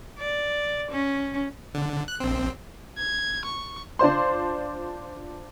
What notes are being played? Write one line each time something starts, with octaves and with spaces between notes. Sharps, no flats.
D5
C#4
D3
F#6
A#1 C4
G#6
C#6
D4 F4 C5 C6